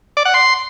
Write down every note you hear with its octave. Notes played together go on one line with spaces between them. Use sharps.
D5
F#5
C6